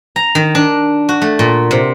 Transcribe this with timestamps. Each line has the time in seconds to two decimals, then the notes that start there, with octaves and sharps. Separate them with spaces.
0.16 A#5
0.35 D#3
0.55 D4
1.09 F#4
1.22 A3
1.39 A#2
1.71 C3